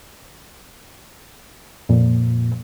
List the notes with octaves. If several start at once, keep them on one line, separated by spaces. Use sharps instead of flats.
F2 A#2